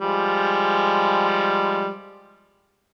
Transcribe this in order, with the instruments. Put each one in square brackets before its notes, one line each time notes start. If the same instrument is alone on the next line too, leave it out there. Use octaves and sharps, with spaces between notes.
[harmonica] F3 G3 G#3